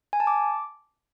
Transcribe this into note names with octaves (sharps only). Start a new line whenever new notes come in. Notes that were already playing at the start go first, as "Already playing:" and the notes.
G#5
A5
D6